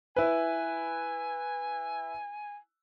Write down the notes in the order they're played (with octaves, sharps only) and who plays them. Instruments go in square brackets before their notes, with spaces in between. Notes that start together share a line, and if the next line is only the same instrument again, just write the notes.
[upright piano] E4 B4 [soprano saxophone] G#5